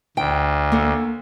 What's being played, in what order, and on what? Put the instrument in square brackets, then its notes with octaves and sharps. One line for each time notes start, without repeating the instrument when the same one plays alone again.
[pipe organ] D2 [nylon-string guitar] G5
[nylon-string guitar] A#3 A4